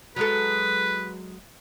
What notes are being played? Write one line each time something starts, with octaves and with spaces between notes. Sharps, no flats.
F#3 G#3 A4 B4